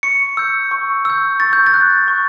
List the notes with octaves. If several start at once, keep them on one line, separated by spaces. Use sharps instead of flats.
C#6 C#7
E6 G6
C#6
E6 G6
C#6 A6
G6
A6
F#6
C#6